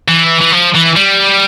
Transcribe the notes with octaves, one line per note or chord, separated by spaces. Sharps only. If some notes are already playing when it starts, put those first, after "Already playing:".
E3
E3
F3
E3
G3